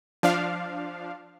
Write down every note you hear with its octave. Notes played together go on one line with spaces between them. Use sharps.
F3 D4 F5